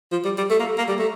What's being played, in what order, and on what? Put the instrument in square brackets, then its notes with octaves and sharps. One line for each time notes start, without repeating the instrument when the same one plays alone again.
[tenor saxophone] F3
G3
G3
A3
A#3
A#3
G3
A3